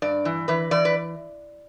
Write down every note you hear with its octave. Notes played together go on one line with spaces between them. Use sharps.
G2 D5
E3
E3 B4
E3 D5
B4